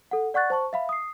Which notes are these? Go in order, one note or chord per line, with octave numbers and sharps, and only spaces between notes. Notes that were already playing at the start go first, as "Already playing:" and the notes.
A4 F#5
D5 F#5 C#6 F#6 A6
C5 A5 C#6
E5 F5 B5
D#6 C7